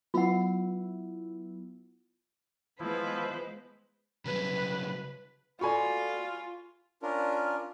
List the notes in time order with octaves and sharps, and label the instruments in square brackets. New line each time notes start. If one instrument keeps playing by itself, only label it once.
[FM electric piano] F#3 B3 E4 [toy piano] F4 F#5
[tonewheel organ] E3 F4 [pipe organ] F3 E4 [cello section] G#3 B3 [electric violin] B4 C5
[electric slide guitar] C#3 F#3 G3 [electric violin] B4
[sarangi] F4 [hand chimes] F#4 A4 D5 [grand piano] G#5 B5 C#6
[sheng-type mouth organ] C#4 D4 F4 A#4